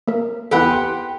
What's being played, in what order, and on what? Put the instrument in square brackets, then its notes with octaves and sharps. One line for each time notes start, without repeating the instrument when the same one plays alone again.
[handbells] A#3 A#4
[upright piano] E2 E3 B3 [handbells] E4 A4 [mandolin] G4 B4 F#5
[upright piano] G5 C6